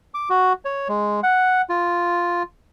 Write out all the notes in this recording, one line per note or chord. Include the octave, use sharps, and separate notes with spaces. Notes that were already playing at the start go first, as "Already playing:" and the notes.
D6
F#4
C#5
G#3
F#5
F4